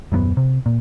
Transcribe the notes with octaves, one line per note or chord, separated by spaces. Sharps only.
D#1 F#2 A3 B3
C3
A#2